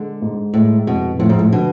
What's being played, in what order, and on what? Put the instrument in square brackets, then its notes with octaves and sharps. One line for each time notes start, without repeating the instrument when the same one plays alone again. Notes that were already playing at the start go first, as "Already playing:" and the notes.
Already playing: [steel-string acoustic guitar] D3 [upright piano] G#3
[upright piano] G#2
[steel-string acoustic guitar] A2 [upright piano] G#3
[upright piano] F2 [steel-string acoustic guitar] B2
[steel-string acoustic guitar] A2 [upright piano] F3
[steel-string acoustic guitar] G#2
A2
[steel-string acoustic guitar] B2 [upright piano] D3